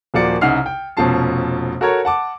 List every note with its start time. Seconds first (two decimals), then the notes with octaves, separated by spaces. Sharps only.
0.14 D#1 F3 A#3 F#4 D5 C#7
0.41 C2 C#3 D#4 F#5 F6 C7
0.66 G5
0.97 F1 B2 F3 C#4 A5 C7
1.81 F#4 A4 A#4 C#5
2.05 F#5 A5 D6